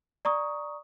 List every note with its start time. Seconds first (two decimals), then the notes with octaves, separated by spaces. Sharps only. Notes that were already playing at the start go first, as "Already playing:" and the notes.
0.25 D5 A#5 C#6 D#6